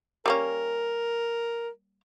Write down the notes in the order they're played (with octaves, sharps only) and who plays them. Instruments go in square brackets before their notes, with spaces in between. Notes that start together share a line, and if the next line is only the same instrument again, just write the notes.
[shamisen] G3 A#3 C#4 [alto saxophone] A#4